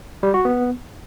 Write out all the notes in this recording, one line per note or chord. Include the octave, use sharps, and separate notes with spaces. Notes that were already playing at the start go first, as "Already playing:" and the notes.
G3
F#4
B3